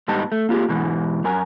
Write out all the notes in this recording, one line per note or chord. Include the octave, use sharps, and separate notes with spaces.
G#2 G3 B3 D#4 A5
A3
A#3 F4 G4 G#4
G#2 B2 E3
F#2 A#4 G#5